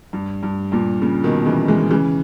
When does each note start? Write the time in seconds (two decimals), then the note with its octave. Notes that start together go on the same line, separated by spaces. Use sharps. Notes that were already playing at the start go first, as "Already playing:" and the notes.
0.13 G2
0.43 G2
0.72 G2 A#2
1.02 A#2 C#3
1.23 B2 D#3
1.46 C#3 E3
1.68 E3 G#3
1.91 C#3 E3